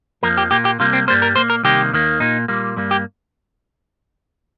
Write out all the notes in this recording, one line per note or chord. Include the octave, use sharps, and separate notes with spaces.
F2 F3 A#3 A#4
G4
A#2 A#3 G4
G4
C2 C3 G3 A#3 F4
C4
G2 G3 A#3 C5
A#4
A#2 A#3 C5
A#4
C2 C3 D#3 A#3 G4
D#2 D#3 A#3
A#2 A#3 D#4
A#2 G3 A#3
G2 G3 A#3
G4